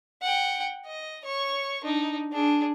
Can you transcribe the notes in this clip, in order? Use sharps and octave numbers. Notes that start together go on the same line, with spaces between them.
F#5 G5
D#5
C#5 C#6
D4 D#4
D4 G#4